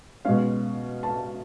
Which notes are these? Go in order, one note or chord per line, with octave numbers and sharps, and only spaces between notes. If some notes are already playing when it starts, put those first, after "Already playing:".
B2 G#3 C#4 F5
A5